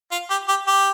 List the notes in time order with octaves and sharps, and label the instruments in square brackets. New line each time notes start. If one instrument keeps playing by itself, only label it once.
[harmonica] F4
G4
G4
G4